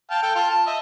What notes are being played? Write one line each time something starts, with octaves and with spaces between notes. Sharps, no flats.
F5 G5 A5
A4 G5
F4 F5 A5
A5
D#5 E5